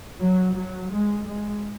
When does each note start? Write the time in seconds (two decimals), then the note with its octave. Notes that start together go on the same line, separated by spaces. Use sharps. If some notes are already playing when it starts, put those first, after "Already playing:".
0.20 F#3
0.55 F#3
0.91 G#3
1.27 G#3